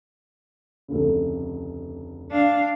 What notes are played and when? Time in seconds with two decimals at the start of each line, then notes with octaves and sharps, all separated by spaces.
0.88 F1 D2 C#3
2.31 D4 F5